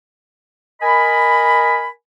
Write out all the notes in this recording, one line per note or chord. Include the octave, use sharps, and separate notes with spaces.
A#4 D#5 G#5 B5